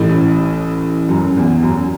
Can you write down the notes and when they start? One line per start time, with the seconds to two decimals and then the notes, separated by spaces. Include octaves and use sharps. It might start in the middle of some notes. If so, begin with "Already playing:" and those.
Already playing: A1 A2
1.09 F#2
1.37 E2
1.63 F#2